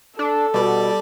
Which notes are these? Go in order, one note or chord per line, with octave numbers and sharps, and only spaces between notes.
D4 A4
B2 G3 D5